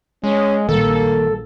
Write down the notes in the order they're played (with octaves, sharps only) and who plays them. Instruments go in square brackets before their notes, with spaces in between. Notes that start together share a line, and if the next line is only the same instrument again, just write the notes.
[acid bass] G#3 [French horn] C#4
[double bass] A#1 [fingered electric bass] D#3 G3 [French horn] A#3 [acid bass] A4